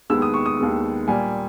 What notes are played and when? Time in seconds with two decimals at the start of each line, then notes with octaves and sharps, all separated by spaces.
0.10 D#2 D#3 G#3 B3 E6
0.22 D#6
0.34 C#6
0.46 D#6
0.58 D#2 D#3 G#3 B3
1.08 A#2 G3 A#3 G#5